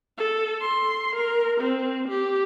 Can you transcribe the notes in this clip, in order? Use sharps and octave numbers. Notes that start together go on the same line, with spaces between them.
A4
C6
A#4
C4
G4